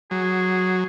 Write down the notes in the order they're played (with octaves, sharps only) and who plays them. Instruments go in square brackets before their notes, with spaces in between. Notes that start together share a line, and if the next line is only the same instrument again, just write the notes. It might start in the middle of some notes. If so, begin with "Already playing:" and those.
[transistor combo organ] F#3 [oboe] G#4